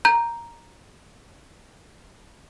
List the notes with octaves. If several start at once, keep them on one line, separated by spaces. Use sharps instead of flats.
A#5 G6